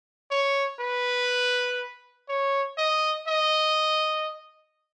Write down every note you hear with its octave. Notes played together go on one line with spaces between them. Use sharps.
C#5
B4
C#5
D#5
D#5